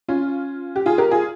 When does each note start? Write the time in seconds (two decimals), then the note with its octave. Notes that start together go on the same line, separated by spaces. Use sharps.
0.08 C#4 F4
0.76 G4
0.86 F4 G#4
0.98 G4 A#4
1.11 F4 G#4